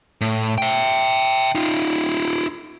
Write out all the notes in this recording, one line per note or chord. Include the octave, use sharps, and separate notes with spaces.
A2
E5 G5
D#4 F4